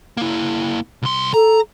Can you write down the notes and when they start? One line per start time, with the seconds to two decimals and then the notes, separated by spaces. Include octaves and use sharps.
0.17 A#3 E4
1.02 C2 C6
1.34 A4 A#5